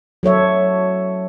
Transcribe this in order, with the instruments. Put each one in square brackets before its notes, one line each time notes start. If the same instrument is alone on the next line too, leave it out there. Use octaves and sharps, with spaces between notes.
[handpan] F#3 A4 C#5 E5